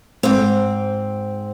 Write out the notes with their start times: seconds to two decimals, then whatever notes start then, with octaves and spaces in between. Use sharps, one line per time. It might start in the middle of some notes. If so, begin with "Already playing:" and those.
0.23 G#2 C4